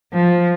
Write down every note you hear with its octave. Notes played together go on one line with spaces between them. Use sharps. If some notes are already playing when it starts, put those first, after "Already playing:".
F3